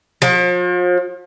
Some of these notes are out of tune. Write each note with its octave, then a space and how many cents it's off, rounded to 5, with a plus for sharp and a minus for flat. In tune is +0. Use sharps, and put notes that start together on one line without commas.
F3 +40